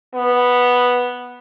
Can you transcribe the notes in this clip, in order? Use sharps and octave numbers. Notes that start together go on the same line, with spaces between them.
B3